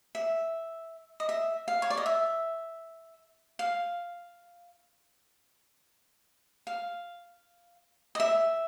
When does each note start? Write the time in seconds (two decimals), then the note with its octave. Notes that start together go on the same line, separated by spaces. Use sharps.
0.15 E5
1.20 D#5
1.29 E5
1.68 F5
1.82 C#5
1.90 D5
1.97 D#5
2.06 E5
3.59 F5
6.67 F5
8.15 D#5
8.20 E5